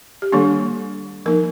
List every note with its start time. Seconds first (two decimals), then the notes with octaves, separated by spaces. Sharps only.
0.22 G4
0.32 D#3 G3 A#3 D4 A4
1.26 F3 A#3 D#4 A#4